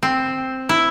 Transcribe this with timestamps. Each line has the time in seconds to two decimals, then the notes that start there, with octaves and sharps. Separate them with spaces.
0.03 C4
0.69 E4